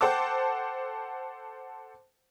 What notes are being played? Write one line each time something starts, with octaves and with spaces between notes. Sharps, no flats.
A4 C5 F#5 G5 A5 D6